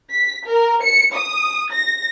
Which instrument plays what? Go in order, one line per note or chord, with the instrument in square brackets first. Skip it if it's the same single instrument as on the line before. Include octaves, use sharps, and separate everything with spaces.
[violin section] B6
A#4
C#7
D#6
A#6